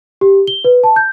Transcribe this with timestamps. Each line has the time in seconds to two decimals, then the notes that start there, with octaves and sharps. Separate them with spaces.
0.21 G4
0.47 G7
0.64 B4
0.84 A5
0.96 G6